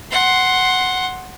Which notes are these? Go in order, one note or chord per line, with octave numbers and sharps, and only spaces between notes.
F#5 C6